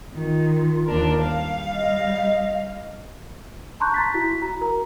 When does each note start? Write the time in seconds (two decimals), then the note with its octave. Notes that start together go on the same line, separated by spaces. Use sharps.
0.14 D#3 F4
0.86 D#2 D4 A#4
1.22 G3 F5
1.74 D#5
3.80 A5 A#5 C6 C#6 F#6 G6
3.94 A#5 A6 B6
4.14 E4 F#4 B6
4.42 F#4 A#5
4.61 A#4 A#5